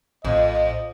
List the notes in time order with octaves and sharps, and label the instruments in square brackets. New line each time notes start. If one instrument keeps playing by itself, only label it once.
[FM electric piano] A#1 A2 [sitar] F2 [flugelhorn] D#5